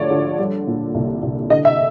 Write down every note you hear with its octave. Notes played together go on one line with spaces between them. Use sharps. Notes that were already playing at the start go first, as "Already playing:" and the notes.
Already playing: D2 D3 F3 C#5 D5
D3
G3
A#2
C2
C2
D3 D#5
E5